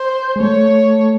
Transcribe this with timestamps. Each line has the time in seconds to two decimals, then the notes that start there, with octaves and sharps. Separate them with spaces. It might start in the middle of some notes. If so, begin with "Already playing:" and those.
Already playing: C5
0.36 G#3
0.40 A3 C#5